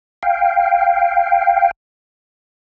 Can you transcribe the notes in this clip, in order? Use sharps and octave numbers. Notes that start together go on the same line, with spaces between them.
F5 G5